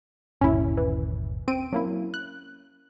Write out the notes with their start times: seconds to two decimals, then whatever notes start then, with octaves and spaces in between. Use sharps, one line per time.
0.41 G1 D#2 A#2 C#4 E4
0.77 E3
1.48 C4 D7 D#7
1.73 F#3 A#3 C#4 E4
2.14 F#6